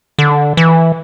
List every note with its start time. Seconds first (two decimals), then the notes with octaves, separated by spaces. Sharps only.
0.19 D3
0.57 E3